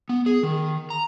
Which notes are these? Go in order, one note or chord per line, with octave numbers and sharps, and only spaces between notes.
B3
G#4
D#3
A#5